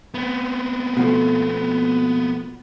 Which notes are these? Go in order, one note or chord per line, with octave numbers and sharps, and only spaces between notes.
B3 C4
B2 F3 A3